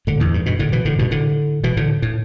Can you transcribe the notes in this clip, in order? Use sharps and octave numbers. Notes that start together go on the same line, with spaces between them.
A2 D3
E2 A2
G2
G2 B2
A2 D3
B2 E3
A2 D3
G2 B2
A2 D3
B2 E3
A2 D3
A2